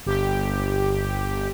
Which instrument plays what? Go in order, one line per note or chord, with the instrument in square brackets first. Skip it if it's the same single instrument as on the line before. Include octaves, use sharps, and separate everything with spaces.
[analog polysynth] G1 G4